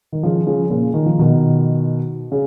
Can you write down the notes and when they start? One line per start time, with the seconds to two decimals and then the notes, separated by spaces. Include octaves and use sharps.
0.12 D#3
0.23 C#3 F3
0.47 C#3 F3
0.70 A#2 C#3
0.94 D#3
1.06 F3
1.19 B2 D#3
2.32 C#3